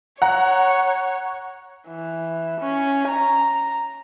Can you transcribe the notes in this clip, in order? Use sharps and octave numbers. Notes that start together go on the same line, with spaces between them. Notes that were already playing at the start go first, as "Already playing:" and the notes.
C#5 F#5 A#5
E3
C#4
A#5